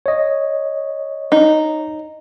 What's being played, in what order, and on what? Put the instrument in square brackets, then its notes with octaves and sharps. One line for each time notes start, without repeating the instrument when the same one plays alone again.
[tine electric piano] C#5 D#5
[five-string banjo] D#4